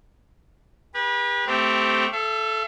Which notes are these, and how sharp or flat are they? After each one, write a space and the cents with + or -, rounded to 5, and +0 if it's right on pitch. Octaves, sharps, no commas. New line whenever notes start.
G4 +40 B4 -30
A3 +0 C4 -20 G4 +0
A4 -10 E5 +40